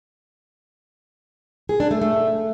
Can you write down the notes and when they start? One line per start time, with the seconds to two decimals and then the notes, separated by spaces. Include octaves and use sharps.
1.69 G#4
1.80 D4
1.91 A3
2.01 A3